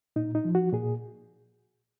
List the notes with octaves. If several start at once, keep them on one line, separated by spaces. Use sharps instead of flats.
A#2 D#4
D#4
F3
F#4
A#2 G#4